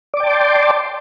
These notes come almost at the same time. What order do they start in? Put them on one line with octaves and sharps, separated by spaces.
D5 D6 G5 A5 C6